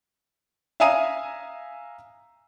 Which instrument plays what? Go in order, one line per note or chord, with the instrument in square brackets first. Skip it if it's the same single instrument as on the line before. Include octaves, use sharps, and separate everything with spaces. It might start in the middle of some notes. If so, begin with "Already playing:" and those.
[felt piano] E5 F5 G#5 A#5 D#6 D#7